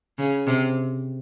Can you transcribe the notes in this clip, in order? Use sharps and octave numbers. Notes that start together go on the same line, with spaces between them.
C#3
C3